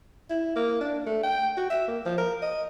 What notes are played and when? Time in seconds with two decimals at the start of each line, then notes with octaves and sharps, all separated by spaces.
0.30 E4
0.56 A#3
0.81 D4
1.06 A3
1.23 G5
1.57 F#4
1.70 E5
1.88 A#3
2.05 F3
2.18 A#4
2.42 D#5